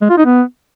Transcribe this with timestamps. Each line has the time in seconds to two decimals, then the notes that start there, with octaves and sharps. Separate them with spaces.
0.01 G#3
0.09 F4
0.17 D#4
0.25 B3